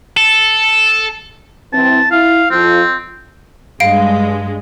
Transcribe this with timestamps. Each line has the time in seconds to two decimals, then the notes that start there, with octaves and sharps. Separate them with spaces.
0.17 A4
1.73 G2 E3 C4 A5
2.11 E4 F5
2.51 F2 F3 C4
3.80 G2 G#3 F5 D7